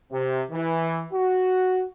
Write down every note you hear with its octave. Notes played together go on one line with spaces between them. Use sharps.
C3
E3
F#4